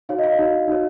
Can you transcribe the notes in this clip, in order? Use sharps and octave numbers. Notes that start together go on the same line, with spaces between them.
D#4 F#4 C#5 F5
D#5
F5
D#4 F#4 C#5
D#4 F#4 C#5